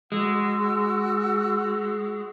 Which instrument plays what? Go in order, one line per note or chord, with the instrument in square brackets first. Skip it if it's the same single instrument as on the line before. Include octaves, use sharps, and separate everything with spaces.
[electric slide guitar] G#3 [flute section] F#4 F#5 E6